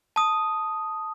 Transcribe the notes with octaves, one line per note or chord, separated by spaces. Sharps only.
A5 D#6